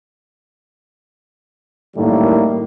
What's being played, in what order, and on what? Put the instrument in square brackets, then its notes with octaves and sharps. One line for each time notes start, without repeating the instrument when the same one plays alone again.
[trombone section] F#2 A2 D#3 G3 A3 A#3